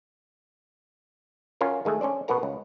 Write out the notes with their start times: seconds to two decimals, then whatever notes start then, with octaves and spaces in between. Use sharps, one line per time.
1.61 C#4 F4 F#4 A#4
1.85 D#3 G#3 A3 G#5
2.01 C#4 D4 C5 D5
2.28 B2 B3 F#4 A#4 A#5
2.43 C#2